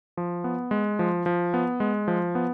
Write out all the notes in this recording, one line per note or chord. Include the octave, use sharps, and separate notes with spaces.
F3
B3
G#3
F3
F3
B3
G#3
F3
B3